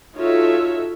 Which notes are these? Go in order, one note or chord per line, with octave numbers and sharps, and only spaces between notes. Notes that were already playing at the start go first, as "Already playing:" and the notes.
D#4 F4 F#4 A4 C#5 E5